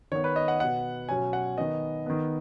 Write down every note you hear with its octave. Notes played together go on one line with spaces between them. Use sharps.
D#3 B3 C#5
B4
D#5
F#5
B2 B3 F#5
B2 F#3 C#4 G#5
F#5
D#3 B3 D#5
D#3 B3